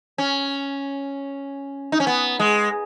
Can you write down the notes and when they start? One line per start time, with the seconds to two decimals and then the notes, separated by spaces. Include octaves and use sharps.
0.18 C#4
1.92 D#4
2.00 C#4
2.07 B3
2.39 G#3